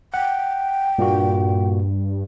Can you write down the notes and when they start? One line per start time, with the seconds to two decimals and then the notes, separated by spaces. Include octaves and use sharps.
0.14 F#5 G5
0.98 G2 A#2 A#3 F#4